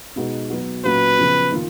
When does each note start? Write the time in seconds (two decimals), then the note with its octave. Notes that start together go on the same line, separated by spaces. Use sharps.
0.16 B2 G#3 B3 D#4 F#4
0.50 F#3 B3 F#4
0.85 A#2 F#3 C#4 F#4 B4
1.18 C#3 F3 B3
1.52 D#3 A#3 F4